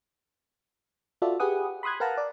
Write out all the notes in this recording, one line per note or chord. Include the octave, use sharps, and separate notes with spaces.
F4 F#4 A4 D5 E5
G4 G#4 B4 F#5 D#6
B5 C6 D#6 F#6 G#6
A#4 B4 F5 F#5 A5 A#5
D5